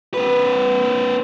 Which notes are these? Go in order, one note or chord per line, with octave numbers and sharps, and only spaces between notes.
C4 B4